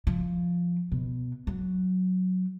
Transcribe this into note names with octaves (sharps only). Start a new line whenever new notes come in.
F3
B2
F#3